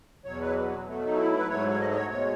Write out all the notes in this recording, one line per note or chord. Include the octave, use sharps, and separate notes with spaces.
E2 B2 F#3 C#5
B4
B2 F#3 A3
D#4
E4
B4
G#2 F#3 A3 C#5
C#5
D#5
D#5
C#5
B2 G#3 C#5